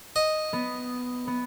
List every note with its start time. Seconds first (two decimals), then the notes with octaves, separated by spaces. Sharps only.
0.16 D#5
0.53 B3
1.27 B3